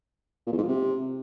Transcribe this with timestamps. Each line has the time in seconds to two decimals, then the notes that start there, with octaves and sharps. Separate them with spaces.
0.47 A#2
0.52 E2
0.57 G#2
0.63 F3
0.68 C3